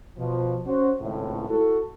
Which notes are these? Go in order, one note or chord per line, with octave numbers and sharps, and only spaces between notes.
B2 F3
C#4 F#4 C5
G#1 C#2 A2
E4 F#4 A4